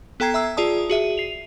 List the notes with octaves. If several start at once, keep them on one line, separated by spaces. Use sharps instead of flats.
B3 A4 G5 A#5 G#6 C7
E5 A#5 E6
F4 G#4 D5 A5 D#6
F#4 G#4 E5 D#7
C7 F7